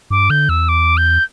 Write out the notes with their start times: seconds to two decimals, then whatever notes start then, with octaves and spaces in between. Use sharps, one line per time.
0.10 G2 D6
0.30 D3 G6
0.49 E2 E6
0.68 D6
0.97 G6